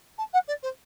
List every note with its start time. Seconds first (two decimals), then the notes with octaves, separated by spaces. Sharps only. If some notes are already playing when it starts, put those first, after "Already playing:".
0.18 A5
0.33 F#5
0.48 D5
0.63 C5